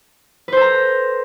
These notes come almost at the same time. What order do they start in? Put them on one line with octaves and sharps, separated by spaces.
B4 C5 A4 A#5